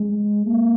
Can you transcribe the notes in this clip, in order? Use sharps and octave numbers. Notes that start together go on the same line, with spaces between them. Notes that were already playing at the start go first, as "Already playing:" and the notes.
Already playing: G#3
A#3